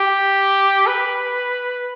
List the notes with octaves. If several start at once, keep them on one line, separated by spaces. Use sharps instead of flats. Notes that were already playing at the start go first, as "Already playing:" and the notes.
Already playing: G4
B4